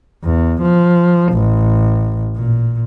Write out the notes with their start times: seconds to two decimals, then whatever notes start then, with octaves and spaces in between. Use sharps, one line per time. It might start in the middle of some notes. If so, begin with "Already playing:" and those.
0.24 E2
0.62 F3
1.33 A1
2.35 A#2